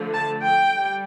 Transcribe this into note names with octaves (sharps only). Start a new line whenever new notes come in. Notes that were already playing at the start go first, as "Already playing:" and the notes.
Already playing: D3 F3 A3
A5
G5
G3